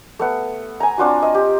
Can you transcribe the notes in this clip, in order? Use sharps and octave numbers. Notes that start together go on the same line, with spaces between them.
A3 B3 F#5
G#5 A#5
C4 D4 F4 F#4
D#5
G4